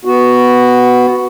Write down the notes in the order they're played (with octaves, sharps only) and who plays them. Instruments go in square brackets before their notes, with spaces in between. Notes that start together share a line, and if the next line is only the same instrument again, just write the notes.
[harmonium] B3 F#4